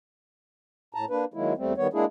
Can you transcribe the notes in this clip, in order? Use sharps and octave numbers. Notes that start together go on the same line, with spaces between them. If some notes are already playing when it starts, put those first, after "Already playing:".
A2 A5 A#5
A#3 D4 B4
D#3 F#3 G#3 A#3 E4
E2 G3 A3 C4
D#3 G3 B3 C#5
G#3 A#3 D4 E4 G#4